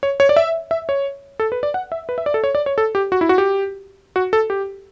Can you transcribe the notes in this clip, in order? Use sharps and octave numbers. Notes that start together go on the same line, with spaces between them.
C#5
C#5
D5
E5
E5
C#5
A4
B4
D5
F#5
E5
B4
E5
D5
A4
C#5
D5
C#5
A4
G4
F#4
E4
F#4
G4
F#4
A4
G4